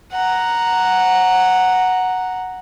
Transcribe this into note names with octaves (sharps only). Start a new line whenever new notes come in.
F#5 A#5